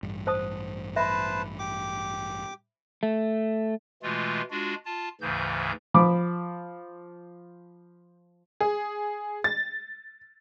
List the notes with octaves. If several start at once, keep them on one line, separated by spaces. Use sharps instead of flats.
A1 G2
C5 A5 D#6
B4 C5 E5 A5 B5
G4 D6
A3
B2 E3 G#3 A3 F4
G#3 D4 F4 F#4
F4 A5
D2 G#2 C#3 E3 G6
F3 B5 D6
G#4
A6